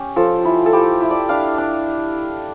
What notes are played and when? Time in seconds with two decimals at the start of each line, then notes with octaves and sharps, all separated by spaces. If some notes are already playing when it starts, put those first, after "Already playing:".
Already playing: C#4 G4
0.16 F3 A4
0.45 E4
0.66 A4
0.73 E4 G4
1.01 E4
1.11 D5
1.29 D4 F5
1.58 D4